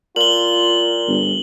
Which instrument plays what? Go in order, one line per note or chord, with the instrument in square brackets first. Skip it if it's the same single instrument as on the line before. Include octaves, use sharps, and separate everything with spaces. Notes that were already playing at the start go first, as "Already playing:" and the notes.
[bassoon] A#2 [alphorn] F4 [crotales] F#7 G7
[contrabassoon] G1